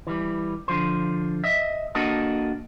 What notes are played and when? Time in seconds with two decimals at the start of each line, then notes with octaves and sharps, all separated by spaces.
0.07 E3 G3
0.68 D3 F3 C5
1.44 D#5 E5
1.95 A#3 D4 F#4 A4 A#4 D#5